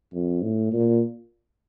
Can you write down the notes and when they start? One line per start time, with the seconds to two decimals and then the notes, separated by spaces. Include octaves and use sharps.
0.13 F2
0.42 A2
0.73 A#2